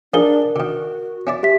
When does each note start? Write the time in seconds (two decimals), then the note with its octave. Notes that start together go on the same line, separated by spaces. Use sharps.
0.14 F3 D4 D#4 G#4 A#4 G7
0.56 D3 D#3 F#4
1.27 C#4 E4 D5
1.43 G4 E5 B6